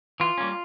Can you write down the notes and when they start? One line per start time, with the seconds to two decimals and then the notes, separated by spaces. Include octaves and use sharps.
0.20 E3 F4
0.38 G3 A#3 C#4